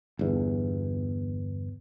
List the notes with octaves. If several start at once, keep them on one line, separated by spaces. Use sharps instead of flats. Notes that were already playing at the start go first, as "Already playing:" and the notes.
G1 E2